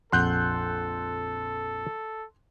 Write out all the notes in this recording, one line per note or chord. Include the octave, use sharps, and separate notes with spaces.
A#1 F2 A4 F#5 C6 F#6 G6